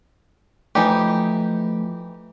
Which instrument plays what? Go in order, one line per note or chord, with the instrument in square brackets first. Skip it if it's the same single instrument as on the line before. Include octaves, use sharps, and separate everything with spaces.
[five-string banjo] E3 D#4 G4 [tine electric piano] F3 A3